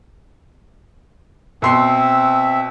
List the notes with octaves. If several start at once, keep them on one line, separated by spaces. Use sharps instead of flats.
B2 C4 E5 C6 C7